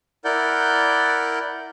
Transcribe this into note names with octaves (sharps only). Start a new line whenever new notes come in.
E4 A#4 D5 F#5 G6